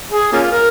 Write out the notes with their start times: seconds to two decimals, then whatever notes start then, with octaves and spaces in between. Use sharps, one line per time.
0.13 G#4
0.33 A#3 C#4 F4
0.52 A#4